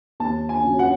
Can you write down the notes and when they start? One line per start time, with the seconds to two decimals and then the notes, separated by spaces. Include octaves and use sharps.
0.20 D#2 A5
0.49 G#5
0.64 C#3 F#3
0.79 F#5